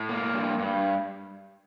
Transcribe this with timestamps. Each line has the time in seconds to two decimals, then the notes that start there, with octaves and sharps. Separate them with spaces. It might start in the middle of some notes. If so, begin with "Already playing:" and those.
Already playing: A2
0.09 A#3
0.34 G2
0.59 G2